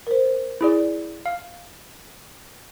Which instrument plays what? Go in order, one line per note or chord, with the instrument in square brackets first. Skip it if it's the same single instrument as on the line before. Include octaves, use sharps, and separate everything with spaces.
[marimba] A#4 C5
[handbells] E4 G#4 D5
F5